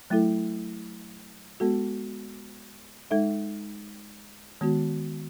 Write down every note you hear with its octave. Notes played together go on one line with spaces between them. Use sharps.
F#3 A3 E4 A4
G#3 B3 F#4 A4
G#3 D#4 A4 E5
D#3 G#3 B3 F#4